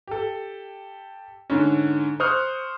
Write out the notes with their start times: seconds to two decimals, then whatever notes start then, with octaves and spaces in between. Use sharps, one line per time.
0.07 G4 A4
1.50 G#2 D3 C#4
2.20 C5 C6 C#6 D#6 F6 F#6